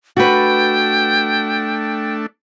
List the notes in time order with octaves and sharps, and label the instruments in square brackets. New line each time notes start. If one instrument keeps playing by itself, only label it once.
[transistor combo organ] A3 D4 [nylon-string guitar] F#4 B4 [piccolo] G5